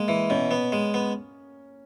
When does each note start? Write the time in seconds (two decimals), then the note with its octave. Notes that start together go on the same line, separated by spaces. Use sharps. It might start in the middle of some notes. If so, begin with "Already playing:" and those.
Already playing: G#3 A#3
0.08 E3
0.30 B2 C#4
0.51 B3
0.72 G#3
0.94 B3